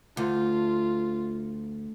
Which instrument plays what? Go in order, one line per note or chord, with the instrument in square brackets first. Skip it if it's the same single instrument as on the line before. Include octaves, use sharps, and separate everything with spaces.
[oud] D2 [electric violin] F4